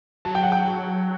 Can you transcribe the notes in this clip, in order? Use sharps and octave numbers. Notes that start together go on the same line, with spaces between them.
F#3 A5
G5
F#5
G5